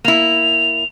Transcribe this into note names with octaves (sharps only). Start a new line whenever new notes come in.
A#3 E4 F7